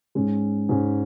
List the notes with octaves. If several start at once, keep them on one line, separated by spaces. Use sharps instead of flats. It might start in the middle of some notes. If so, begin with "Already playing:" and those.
G#2 G#3 C#4
G#2 G#3 C#4